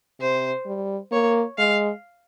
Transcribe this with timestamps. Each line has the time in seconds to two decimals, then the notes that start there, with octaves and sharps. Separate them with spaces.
0.20 C3 C5
0.66 G3
1.12 A#3 C#5
1.58 G#3 F5